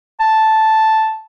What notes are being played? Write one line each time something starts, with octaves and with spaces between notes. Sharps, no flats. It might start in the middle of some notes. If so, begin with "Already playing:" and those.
A5